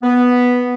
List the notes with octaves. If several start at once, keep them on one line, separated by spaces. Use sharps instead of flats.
B3